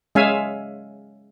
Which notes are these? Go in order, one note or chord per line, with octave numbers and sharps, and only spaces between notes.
G#3 C#4 E5 F5 G#5